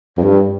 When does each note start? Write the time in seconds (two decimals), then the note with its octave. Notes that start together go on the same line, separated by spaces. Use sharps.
0.17 F2
0.23 G2 G3